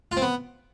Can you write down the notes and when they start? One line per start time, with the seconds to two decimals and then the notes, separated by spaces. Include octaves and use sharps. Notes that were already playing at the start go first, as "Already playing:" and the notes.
0.12 F4
0.17 C4
0.22 B3